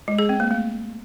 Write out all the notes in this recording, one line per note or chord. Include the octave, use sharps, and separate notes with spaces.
G#3
G#4
C4
A#3
A3